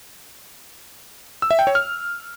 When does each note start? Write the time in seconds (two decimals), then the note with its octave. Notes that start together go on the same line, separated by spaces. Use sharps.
1.42 E6
1.51 E5
1.59 G5
1.67 C#5
1.75 F6